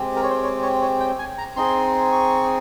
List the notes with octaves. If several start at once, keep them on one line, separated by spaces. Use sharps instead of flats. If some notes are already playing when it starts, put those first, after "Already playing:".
Already playing: G#3 C4 G4
A#4
C#5
C5
C#5
C#5
C#5
G5
G#5
A#5
C4 D#4 G#4 C6
C#6